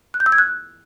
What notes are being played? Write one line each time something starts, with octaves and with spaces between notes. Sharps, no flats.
F#6
G6
E6
G#6
F#6